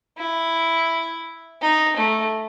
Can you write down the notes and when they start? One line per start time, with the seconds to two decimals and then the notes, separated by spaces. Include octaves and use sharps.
0.18 E4
1.62 D#4
1.97 A3